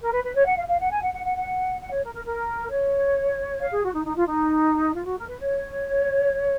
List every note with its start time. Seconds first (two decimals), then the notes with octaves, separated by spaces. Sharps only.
0.02 A#4
0.13 B4
0.24 B4
0.35 C#5
0.46 F#5
0.57 F5
0.69 F5
0.80 F#5
0.91 G#5
1.02 F#5
1.14 F#5
1.25 F#5
1.36 F#5
1.81 F#5
1.92 C#5
2.03 A#4
2.14 A#4
2.26 A#4
2.71 C#5
3.60 F5
3.72 G#4
3.83 F#4
3.94 D#4
4.05 D#4
4.16 F4
4.27 D#4
4.95 F4
5.06 F#4
5.18 A#4
5.28 B4
5.40 C#5